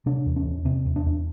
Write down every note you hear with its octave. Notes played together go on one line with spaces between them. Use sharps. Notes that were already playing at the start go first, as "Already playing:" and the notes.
C3 D4
E2
C#4
E2
C3 C4
E2
D4
E2